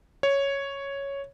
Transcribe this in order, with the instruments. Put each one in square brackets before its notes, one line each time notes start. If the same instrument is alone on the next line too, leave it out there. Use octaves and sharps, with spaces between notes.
[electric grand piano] C#5